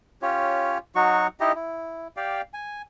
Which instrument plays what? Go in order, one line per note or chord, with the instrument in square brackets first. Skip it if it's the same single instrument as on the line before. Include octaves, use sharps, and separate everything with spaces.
[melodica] C#4 F4 G4 C#5
F#3 D#4 F#4 C#6
D#4 E4 G4 D#5
E4
G4 D5 F5 G5
G#5